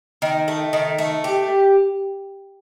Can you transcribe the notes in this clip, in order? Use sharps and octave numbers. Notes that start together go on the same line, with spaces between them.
D#3
A3
D#3
A3
G4